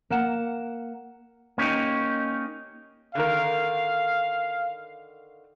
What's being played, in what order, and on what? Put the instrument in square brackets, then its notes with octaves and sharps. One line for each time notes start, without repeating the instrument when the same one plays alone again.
[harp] A#3 F#5 E7
[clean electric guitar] A#3 C#4 D#4 G4
[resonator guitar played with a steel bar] D3 D#3 A#4 [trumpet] F5